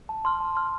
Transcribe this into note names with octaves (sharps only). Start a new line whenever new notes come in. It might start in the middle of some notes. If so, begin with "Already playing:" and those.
A5
C6 F6
A5
C6 F6